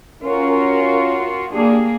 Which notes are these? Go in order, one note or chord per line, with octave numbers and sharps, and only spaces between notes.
C#4 F4 F#4 A#4
A#3 D4 G4 G#4